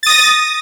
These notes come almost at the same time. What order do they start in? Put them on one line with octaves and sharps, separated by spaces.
A6 D#6 A#6